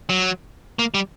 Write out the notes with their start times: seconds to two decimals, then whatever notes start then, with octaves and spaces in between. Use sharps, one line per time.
0.09 F#3
0.79 A#3
0.94 G3